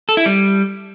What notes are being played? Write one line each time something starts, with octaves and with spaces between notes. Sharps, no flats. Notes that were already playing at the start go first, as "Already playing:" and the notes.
A4
E4
G3